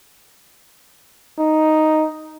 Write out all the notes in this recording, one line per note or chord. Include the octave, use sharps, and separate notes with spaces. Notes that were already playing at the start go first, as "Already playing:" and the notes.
D#4